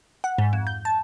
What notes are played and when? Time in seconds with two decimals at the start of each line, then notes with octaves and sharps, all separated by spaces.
0.24 F#5
0.38 G#2
0.53 F2
0.67 G6
0.85 A5